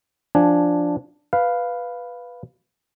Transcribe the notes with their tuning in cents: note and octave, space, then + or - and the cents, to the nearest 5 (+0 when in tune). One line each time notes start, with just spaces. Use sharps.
F3 +0 D4 +0 G#5 +0
B4 +0 F5 +0